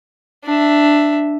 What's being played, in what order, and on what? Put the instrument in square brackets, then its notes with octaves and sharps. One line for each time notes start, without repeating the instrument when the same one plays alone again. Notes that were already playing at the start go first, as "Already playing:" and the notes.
[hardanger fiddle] D4 E5